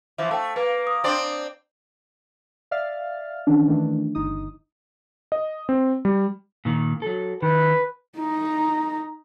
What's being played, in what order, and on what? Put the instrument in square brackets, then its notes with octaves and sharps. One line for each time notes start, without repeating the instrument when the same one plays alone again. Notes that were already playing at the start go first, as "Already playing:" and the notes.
[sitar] E3 F3 [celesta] E5
[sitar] A3 [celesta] G5 A5
[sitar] A#3 [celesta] B4
[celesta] D#6
[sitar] C4 D4 D5
[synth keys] D5 E5 F5 F6 A6
D#3 E3 C#4 D4
D#3 E3 A3 D4
G1 D#4 D#6
[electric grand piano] D#5
C4
G3
[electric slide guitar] A#2 D#3
F#3 A4
[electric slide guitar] D#3 [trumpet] B4
[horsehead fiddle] D#4 A#5